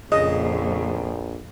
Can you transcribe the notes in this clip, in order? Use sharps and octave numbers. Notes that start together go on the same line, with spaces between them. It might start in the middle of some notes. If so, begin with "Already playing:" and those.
A#1 F2 A#2 C#3 D#5